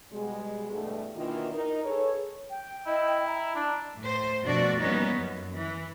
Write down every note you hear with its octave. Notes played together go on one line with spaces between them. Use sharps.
B2 G3 G#3
E2 G2 B2 A3
B2 D#3 E3 A#3 D4 F4
D#4 A#4
G#4 A4 B4 C#5
G5
E4 D#5
A#5
D4
A2 C5
F2 B2 A3 D4 F#4 D5
E3 G3 A#3 B3 C#4 D#4
F#2
E3